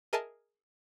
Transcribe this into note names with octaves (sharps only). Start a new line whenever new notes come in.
G#4 A#4 D#5 E5 G#5 A5